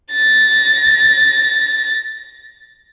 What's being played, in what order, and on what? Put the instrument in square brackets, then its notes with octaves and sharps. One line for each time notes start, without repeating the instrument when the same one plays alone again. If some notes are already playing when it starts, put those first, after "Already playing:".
[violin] A6 A#6